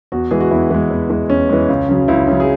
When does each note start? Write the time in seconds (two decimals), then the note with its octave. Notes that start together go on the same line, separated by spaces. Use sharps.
0.12 E2 F#4
0.31 E3 G#3 G#4
0.41 F#4
0.51 E2 E4
0.70 E3 G#3
0.90 E2
1.10 E3 G#3
1.29 E2 C#4
1.49 E3 G#3
1.69 C#2
1.89 C#3 F#3
2.08 C#2 E4
2.28 C#3 F#3
2.40 G#4